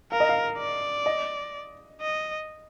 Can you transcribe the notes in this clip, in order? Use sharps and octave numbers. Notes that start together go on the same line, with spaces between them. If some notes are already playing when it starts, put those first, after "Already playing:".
A#4 F5
D#5
F5
D5
D#5
D#5